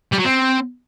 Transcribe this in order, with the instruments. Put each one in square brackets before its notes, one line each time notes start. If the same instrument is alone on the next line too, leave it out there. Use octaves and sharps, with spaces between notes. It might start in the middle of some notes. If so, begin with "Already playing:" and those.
[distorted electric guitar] G3
F#3
C4